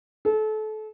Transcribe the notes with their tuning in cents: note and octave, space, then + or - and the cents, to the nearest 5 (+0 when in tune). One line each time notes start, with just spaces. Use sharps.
A4 -30